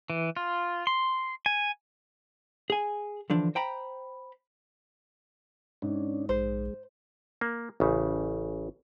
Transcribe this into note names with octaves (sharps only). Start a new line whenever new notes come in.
E3
F4
C6
G#5
G#4 G#5
D3 E3 F3 D4
C5 G5 A#5 B5
G#2 C#4 D4
A#1 G#3 C5
A#3
A1 C#3